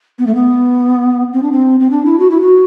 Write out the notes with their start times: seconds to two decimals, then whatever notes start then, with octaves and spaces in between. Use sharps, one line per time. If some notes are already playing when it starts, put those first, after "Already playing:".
0.19 B3
0.27 A3
0.35 B3
1.33 C4
1.43 D4
1.52 C4
1.80 C4
1.90 D4
2.05 E4
2.19 F#4
2.30 E4
2.41 F#4